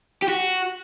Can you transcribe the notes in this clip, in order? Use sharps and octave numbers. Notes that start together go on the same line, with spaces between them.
G4
F#4